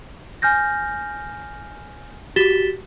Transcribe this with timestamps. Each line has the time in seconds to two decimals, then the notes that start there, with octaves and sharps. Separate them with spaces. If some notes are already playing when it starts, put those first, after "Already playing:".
0.42 G#5 F6 G6 A#6
2.36 F#4 G4 A6 B6 E7 G7